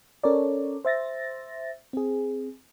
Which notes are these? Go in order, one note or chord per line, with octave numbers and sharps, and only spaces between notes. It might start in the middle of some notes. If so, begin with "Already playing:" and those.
C#4 A4 A#4 C#5 D5
C5 E5 A6 A#6
C4 G#4